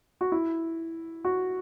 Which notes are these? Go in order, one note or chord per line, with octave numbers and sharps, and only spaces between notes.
F#4
E4
F#4